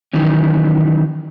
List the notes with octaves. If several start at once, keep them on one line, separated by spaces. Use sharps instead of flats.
D#3 E3 F#3 C#4